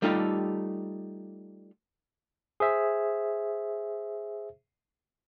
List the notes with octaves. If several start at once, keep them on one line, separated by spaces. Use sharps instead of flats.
G3 A3 D#4 F4 G4 A4
G#4 C5 E5